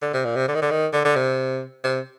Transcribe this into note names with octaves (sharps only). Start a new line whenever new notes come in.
D3
C3
A#2
C3
D3
D#3
D3
D#3
D3
D3
C3
C3